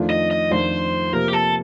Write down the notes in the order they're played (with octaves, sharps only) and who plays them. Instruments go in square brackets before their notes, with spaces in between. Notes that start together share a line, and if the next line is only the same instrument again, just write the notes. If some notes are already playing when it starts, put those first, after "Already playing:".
Already playing: [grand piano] F2 D#3 A3 D4 F4
[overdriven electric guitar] D#5
D#5
[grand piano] F2 D#3 A3 D4 F4 [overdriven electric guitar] C5
[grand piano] C3 F3 A#3 [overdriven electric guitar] A#4
[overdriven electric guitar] G4
A4